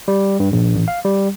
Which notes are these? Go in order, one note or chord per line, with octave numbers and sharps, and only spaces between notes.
G3
G2
A#1
A1
F5
G3